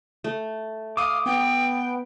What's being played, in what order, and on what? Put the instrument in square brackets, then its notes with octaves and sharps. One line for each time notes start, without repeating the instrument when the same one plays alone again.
[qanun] A3
[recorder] F5 [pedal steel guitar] D6 D#6
[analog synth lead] B3 [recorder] G5